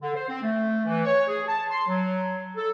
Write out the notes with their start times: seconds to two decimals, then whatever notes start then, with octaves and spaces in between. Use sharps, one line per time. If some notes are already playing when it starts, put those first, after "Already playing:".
0.02 D3
0.15 C5
0.29 C4
0.43 A3
0.86 E3
1.05 C#5
1.28 G#4
1.47 A5
1.71 C6
1.88 F#3
2.57 A4